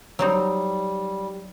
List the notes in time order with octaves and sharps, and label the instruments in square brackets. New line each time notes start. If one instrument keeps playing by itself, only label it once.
[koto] F#3 C4 D#4 [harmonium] G3